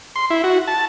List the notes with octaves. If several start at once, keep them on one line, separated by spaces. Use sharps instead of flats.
C6
E4
F#4
A5